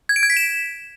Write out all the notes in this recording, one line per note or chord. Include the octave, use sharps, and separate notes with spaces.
G#6
D7
G#6
B6
E7